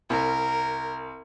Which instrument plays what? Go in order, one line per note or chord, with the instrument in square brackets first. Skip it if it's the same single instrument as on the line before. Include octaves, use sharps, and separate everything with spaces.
[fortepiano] C2 [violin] A#4